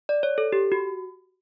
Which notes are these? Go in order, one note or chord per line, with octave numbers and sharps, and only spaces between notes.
D5
C#5
A4
G4
F#4